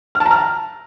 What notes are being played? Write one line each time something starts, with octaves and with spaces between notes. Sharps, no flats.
F6
A5
A#5
F6